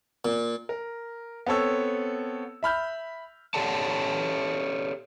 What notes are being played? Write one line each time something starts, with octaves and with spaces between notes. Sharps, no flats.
A#2
A#4
B3 C4 A4 C#5 E6
E5 B5 F6 G6
G4 A4 C#5 D5 A5